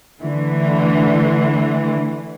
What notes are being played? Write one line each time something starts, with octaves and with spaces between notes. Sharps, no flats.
D3 E3 A3